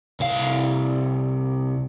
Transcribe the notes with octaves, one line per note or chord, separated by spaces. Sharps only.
C2 F5